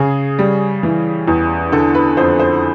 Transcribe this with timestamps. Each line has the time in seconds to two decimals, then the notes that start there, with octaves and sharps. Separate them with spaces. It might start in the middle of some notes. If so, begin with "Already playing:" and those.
Already playing: C#3 G#4
0.39 G3
0.83 E3
1.28 E2
1.72 D3 A4
1.95 B4
2.17 F2 C5
2.39 C5